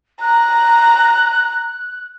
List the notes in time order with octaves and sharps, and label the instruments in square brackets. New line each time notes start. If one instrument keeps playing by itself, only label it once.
[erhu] A#5 [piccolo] F#6